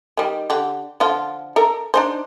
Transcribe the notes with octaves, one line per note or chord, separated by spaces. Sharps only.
D#3 G3
D3 G4
D3 F3 F4
A4 A#4 A#5
D4 D#4 C5